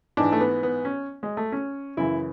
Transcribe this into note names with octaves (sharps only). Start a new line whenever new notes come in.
G#2 E3 D4
A3
B3
B3
C#4
G#3
A3
C#4
F#2 C#3 E3 E4